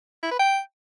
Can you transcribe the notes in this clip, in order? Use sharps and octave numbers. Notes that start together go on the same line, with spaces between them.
E4
B4
G5